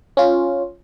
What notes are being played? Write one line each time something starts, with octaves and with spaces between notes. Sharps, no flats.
C#4 F4